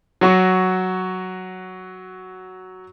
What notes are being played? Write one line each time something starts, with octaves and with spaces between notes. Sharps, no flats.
F#3 F#4 C#6